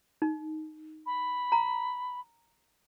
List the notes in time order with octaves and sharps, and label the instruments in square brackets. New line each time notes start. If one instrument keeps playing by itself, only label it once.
[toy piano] D#4
[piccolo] B5
[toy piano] A#5